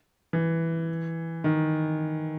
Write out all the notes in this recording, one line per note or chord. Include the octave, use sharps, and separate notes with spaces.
E3
D#3